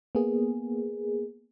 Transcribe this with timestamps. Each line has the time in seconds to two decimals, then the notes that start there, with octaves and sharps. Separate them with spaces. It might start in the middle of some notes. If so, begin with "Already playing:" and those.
0.15 A#3 B3 G#4